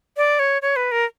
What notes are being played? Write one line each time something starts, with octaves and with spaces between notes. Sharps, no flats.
D5
C#5
C#5
B4
A#4